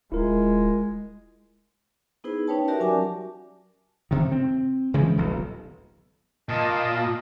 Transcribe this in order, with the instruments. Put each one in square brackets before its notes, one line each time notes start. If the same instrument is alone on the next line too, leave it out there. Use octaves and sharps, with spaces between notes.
[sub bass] D#1 [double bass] G#3 [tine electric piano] E4 F4 A#4
[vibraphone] B3 D#4 E4 G#4 B4 C5
C#4 D#4 B4 C#5 G5 A5
F#4 G4 A#4 D5 E5
F#3 C#4 F#4 G#5 A5 D6
[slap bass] C3 D#3
C4
C#3 E3 F3 G#3
D#1 B1
[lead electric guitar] A#2 [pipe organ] D#5 F5 A5